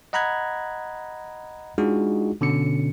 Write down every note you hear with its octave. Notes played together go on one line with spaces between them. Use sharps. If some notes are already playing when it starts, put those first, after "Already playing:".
D#5 F#5 A#5 B5 F#6 G#6
G#3 D4 D#4 F4 F#4 G#4
B2 D3 C#4 C#7